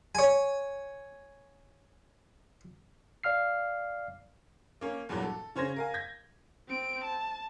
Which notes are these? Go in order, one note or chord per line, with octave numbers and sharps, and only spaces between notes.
C#5 G#5
D5 F5 F6 C7
A#3 C#4
E2 G2 A#2 E3 F#3
A4
C#3 C#4 C5 G#6 A#6
A#4 F5 G#5
G6 G#6 A#6 B6
C4 D7
A5